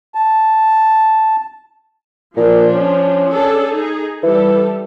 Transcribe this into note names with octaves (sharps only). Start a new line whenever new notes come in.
A5
A#2 F3 D4
C#4
D4 G#4 A4
D#4 G#4
E3 G3 A4